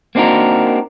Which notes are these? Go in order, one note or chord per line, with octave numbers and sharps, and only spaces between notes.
A#3 C4 D4 D#4 F#4 A#4